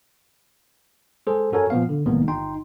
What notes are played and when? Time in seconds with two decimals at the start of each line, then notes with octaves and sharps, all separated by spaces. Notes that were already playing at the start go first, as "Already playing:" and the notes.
1.27 G#3 G#4 A4 C5
1.52 F#2 F#4 A4 A#4 C#5 G#5
1.70 A#2 F3 B3 F5
1.89 D3
2.05 C2 A2 D#3 G#3 A#3 B3
2.28 G1 D#4 G5 C6